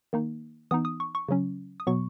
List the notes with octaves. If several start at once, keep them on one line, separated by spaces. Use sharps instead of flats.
D#3 A#3 D#4
E3 B3 D#4 D#6
D#6
C#6
C#6
C#3 F#3 C#4
D#6
B2 F#3 B3 C#6